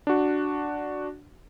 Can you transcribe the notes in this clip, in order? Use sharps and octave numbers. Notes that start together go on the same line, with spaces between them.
D4 F#4